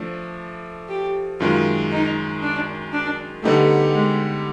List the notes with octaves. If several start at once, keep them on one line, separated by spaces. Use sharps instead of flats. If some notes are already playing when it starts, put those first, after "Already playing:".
Already playing: F3 A3 D4
G4
F#2 D#3 G#3 F4
D#4
D4
D4
D3 G3 A3 B3 D#4 G4
G#3